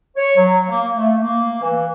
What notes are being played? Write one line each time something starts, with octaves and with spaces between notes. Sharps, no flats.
C#5
F#3
A#3
A3
A#3
E3